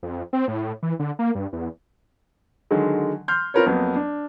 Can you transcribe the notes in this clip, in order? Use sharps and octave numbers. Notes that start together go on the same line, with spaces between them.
F2
C4
A2
E3
D3
A#3
G2
E2
D3 D#3 F#3 G#3
C6 F6 G6
C4 F4 A#4 B4 C#5
F2 F#3 A#3 B3
D4